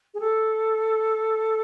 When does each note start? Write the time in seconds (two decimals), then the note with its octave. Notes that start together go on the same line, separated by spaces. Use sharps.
0.14 G#4
0.20 A4